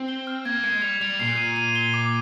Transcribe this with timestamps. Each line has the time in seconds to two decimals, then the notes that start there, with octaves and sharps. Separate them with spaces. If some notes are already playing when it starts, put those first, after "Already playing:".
Already playing: C4
0.08 G7
0.27 F6
0.45 A#3 G#6
0.64 G#3 G#6
0.82 G3 F7
1.01 G3 F7
1.19 A#2 C7
1.37 D#7
1.56 D#7
1.75 G7
1.94 D6